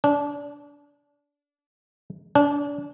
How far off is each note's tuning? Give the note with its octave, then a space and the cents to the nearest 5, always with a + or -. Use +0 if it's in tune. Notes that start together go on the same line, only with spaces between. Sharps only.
D4 -25
D4 -30